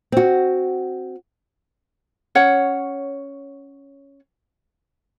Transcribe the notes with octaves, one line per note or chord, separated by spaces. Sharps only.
C4 F#4
C#4 C#5 F#5